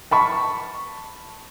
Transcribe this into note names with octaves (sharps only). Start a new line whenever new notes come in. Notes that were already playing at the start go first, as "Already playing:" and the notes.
A5 B5 C#6